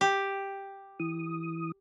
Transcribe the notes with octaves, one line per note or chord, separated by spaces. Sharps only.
G4
E3 D#6